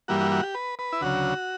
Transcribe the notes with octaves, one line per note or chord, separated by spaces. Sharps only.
G2 E3 G3 A#3 F#4
F#4
F#4
G4
B4
B4
E4
D2 C#3 F#3 F#4